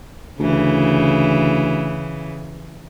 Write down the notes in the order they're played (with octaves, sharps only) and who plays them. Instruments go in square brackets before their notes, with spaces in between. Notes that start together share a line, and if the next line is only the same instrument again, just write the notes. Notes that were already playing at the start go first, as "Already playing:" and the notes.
[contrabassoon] D2 [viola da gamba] C#3 E3